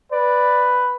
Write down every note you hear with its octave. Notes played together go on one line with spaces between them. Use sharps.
B4 D5